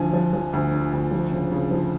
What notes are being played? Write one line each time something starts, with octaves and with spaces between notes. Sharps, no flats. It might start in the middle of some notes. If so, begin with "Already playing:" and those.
Already playing: D2 D3 F3 G#5
F3
F3
D2
D3
D2
F3
C#3
C#3
F3